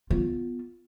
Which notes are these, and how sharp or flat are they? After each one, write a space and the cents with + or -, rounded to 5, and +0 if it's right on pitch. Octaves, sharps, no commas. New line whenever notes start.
B3 +0 F4 +0